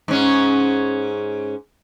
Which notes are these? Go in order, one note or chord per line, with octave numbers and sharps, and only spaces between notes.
G#2 C#4